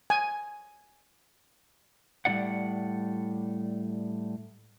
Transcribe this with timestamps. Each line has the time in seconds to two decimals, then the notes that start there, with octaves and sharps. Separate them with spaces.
0.10 G#5
2.25 A2 G3 G#3 E4 D5 F#5